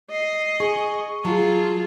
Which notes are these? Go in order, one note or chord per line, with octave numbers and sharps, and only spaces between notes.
D#5 C7
G#4 C#6
F#3 F4 G#4 A5